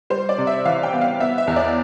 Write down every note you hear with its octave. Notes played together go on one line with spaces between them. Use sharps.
G3 C5
D5
C3
E5
E3 F5
G5
B3
F5
B3 E5
E5
E2
D5